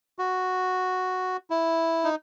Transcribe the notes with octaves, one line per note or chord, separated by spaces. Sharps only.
F#4
E4
D#4